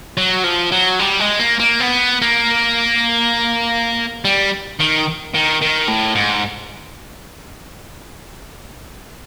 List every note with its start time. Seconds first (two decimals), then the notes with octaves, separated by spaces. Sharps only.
0.18 F#3
0.44 F3
0.72 F#3
0.99 G3
1.20 G#3
1.39 A#3
1.59 A#3
1.80 B3
2.22 A#3
4.25 G3
4.79 D#3
5.34 D#3
5.61 D#3
5.88 A2
6.15 G#2